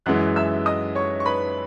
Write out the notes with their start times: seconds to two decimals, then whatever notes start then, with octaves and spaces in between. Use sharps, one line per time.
0.06 F#2 E3 G#3 F#5 F#6
0.36 E5 E6
0.66 D#5 D#6
0.95 C#5 C#6
1.20 C#6
1.26 B4 B5